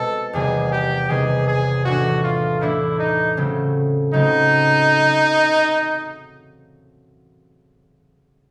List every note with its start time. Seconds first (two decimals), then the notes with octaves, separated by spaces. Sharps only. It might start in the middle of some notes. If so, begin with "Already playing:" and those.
Already playing: B2 G#3 C4 A4
0.33 E2 C3 D#3 G3 B3 G#4
0.72 G4
1.09 E2 C3 D#3 G3 B3 G#4
1.47 G#4
1.85 A2 E3 A3 D4 F#4
2.23 F4
2.61 A2 E3 A3 D4 E4
2.99 D#4
3.37 C#3 F#3 A3 C4
4.13 C#3 F#3 A3 C4 D#4